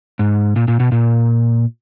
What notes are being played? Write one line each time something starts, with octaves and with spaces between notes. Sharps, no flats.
G#2
A#2
A#2
B2
A#2